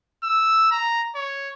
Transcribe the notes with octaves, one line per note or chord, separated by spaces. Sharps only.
E6
A#5
C#5